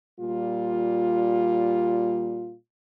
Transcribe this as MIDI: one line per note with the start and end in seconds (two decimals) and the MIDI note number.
0.19 2.55 46
0.19 2.55 55
0.19 2.55 65